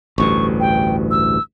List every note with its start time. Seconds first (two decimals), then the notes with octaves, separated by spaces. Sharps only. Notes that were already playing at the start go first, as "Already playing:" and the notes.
0.18 A1 D2 G2 C#6
0.60 G5
1.11 E6